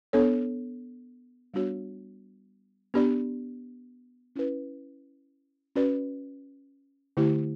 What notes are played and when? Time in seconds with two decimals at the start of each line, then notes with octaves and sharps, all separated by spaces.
0.13 B3 D4 A4 C#5
1.54 G3 B3 D4 F#4 C#5
2.94 B3 D4 G4 D5
4.36 C#4 E4 B4
5.76 C#4 F#4 B4 D5
7.17 D3 A3 E4 G4